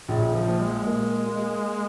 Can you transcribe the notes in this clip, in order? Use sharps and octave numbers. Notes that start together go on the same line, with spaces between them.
A#1 C#3
F3
A#2
G#3
A#3
A#3